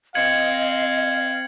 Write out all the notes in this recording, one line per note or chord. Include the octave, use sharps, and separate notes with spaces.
C4 D#5 F5 G#6 C#7 F#7